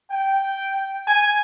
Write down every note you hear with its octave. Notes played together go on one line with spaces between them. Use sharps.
G5
G#5